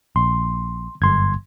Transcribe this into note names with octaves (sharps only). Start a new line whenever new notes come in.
A#1 C6
G1 F#2 C6 G#6